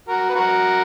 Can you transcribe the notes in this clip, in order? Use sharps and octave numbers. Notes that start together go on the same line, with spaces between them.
F#4 A#4
B4
F#4 A#4